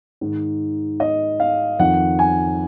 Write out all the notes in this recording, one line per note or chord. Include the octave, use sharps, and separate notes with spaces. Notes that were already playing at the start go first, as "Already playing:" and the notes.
G#2 D#3
D#5
F5
F2 D#3 F#5
G#5